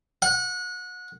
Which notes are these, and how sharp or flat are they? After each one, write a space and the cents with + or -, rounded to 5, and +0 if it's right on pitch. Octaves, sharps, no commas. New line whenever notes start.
F#5 -25